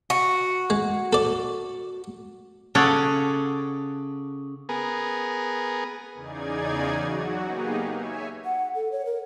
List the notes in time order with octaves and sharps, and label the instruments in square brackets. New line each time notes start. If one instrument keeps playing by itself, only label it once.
[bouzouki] F#4
[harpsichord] G#3
A4 D5
[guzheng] C#3 C#4 A4 C#5 D5 F#5
[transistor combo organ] B3 G#4 A#4
[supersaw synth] E2 C#3 D#4 G#4 D5 G#6
F#3 F#4
A#3 B3 D#4 G4 G#4
C#5 E5 G#5
[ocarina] F#5
A4
C#5
A#4